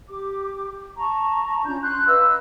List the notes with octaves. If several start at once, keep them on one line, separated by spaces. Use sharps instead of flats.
G4 D6
A5 A#5 C#6
C#4 D4 F4 G6
C6 F#6 G6
B4 D#5 F5 E6